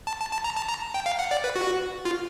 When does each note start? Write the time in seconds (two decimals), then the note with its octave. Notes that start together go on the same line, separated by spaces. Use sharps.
0.07 A5
0.20 A5
0.32 A5
0.44 A#5
0.56 A5
0.69 A#5
0.94 G5
1.06 F5
1.19 F#5
1.31 D5
1.44 B4
1.56 F#4
2.05 F4